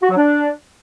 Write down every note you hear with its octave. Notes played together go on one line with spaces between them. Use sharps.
F#4
F#3
D4